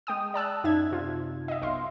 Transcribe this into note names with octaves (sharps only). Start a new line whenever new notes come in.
G#3 G5 D#6
D5 A5 E6 F#6
F#2 D#4 E5 G#6
C3 F4
D#5 E5
B1 F5 C6